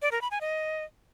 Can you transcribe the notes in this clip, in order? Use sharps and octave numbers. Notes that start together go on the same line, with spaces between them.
D5
A#4
B5
G#5
D#5